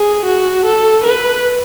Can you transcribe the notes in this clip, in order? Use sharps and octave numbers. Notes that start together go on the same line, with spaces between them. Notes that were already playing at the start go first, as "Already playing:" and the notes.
Already playing: G#4
F#4
A4
B4